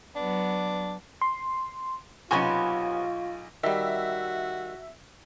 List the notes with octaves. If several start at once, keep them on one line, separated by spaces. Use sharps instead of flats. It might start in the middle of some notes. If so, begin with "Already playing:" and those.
F#3 B3 D4
C6
B1 C3 B3 C#4 F4 G#5 C#6
D#3 G3 F#4 E5